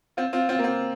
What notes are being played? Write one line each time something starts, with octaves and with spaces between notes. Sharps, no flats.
C4 F4
C4 F4
C4 F4
A#3
C4